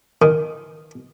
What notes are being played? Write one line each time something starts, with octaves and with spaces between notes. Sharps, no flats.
D#3